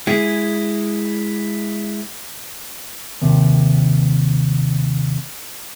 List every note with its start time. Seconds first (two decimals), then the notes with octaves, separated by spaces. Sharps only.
0.07 G#3 E4 G#4
3.22 D#2 C3